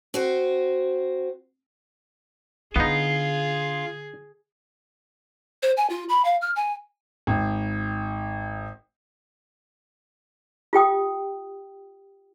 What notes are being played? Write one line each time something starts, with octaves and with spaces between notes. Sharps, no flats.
C4 F#4 C5
D3 B3 D#4 F4 G#4
C5
G#5
F4
B5
F5
F6
G#5
G#1
F4 G4 G5 D#6